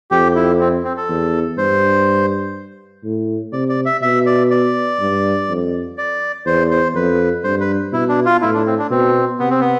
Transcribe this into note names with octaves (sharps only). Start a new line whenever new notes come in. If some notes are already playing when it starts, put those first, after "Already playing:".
F2 G4
E4
C4
C4
A4
E2
G2 C5
A2
C3 D5
D5
E5
B2 E5
D5
D5
G2
F2
D5
E2 C5
C5
F2 B4
G2 C5
B4
B2 E4
D4
F4
A2 E4
D4
C4
D4
B2 C4
C3 B3
C4
B3